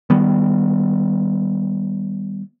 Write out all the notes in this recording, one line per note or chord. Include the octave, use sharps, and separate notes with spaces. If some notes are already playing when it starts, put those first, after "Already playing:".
D#3 G3 B3